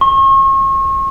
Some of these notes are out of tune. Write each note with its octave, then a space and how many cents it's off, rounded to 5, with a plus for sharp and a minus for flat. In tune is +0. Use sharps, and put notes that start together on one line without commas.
C#6 -40